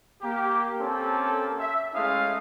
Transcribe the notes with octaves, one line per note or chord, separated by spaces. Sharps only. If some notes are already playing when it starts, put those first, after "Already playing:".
A#3 G4
A#3 C4 C#4 G4 A4
E5
G#3 A3 C#4 E4 F5 D#6